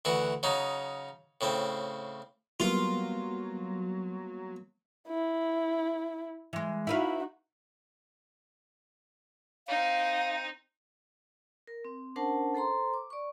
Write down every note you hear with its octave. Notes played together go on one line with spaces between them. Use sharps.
D2 E3 F#4
C#3 F#3 D#4
A2 C#3 C4
F#3 G3 A#3 B3 F4
E4
E3 G#3
D#4 E4 F#4 B4 F5
C4 D#4 F5
A#4
C4
C#4 D4 A#4 C5 F#5 A5
A4 C5 A#5 C6
D6
D5 C#6